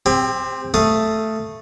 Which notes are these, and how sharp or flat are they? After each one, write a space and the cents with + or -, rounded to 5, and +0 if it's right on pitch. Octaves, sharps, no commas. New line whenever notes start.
C4 +0 G4 +40
A3 +0 F5 +0 D#6 +0